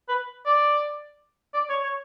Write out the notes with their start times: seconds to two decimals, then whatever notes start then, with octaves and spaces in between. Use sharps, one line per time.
0.09 B4
0.46 D5
1.54 D5
1.70 C#5
1.83 C#5